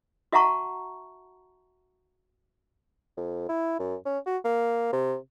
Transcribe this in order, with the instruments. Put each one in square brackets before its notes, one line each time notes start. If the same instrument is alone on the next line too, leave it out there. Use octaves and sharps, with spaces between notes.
[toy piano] F#4 E5 F#5 A5 A#5 C#6
[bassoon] F2
E4
F#2
C#4
F#4
A#3
C3